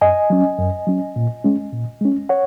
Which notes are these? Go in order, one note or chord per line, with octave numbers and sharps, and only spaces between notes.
F#2 D#5 G#5
F#3 C#4
F#2
F#3 C#4
A#2
G#3 C#4
A#2
G#3 C#4
C#5 F#5